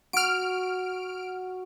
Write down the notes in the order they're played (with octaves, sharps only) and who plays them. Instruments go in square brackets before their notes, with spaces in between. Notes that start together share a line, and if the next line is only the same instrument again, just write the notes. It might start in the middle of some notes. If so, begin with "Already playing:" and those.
[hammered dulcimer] F#4 [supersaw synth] F6 D7